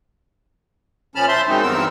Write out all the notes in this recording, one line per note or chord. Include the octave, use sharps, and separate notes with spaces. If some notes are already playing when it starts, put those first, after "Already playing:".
A#2 F3 C#4 A5 B5 F6
C5 E5 A5 C6
D#3 F#3 G#3 C4 D#4
E2 G2 B3 C4 A#4 E6